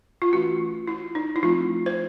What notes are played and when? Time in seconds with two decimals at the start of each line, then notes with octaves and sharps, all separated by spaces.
0.22 F4
0.32 E3 A3 C#4 F#4
0.88 E4
1.15 D#4
1.36 E4
1.43 F3 A3 C4 F4
1.86 C5